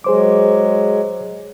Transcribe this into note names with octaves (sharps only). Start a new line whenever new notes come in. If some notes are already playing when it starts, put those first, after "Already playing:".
F#3 G#3 G#4 C5 D6